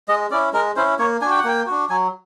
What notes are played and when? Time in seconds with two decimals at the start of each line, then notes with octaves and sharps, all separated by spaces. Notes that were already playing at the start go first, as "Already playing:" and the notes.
0.08 G#3 D#5
0.31 C#4 E4 D5
0.53 G#3 A#4
0.76 C#4 E4 C5
0.99 A#3 C#5
1.21 D4 F#4 G#5
1.31 G5
1.39 F#5
1.44 A#3 G5
1.67 D4 F#4
1.89 F#3 G#5